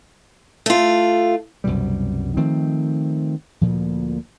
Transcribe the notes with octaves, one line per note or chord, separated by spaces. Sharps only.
A3 F4
C2 F#2 B2 G3
D#3 F3 A3 C4
D2 A#2 F3